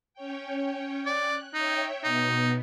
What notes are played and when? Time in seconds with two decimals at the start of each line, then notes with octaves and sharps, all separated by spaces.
0.14 C#4 C#5 G5
1.06 D5 F#6
1.54 D#4 C#5 E5 G5
2.04 B2 B3 D#4